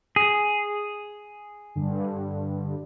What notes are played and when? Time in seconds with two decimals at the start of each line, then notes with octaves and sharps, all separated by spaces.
0.16 G#4
1.76 G2 D3